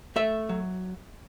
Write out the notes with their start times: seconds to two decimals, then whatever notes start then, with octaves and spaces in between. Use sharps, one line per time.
0.16 A3 E5
0.49 F#3